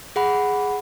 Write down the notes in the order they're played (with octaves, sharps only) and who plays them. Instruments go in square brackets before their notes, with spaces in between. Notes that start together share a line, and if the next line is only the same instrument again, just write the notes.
[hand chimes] G#4 F#5 B5